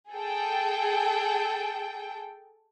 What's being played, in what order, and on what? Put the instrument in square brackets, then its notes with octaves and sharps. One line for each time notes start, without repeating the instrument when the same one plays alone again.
[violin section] G#4 A4 G5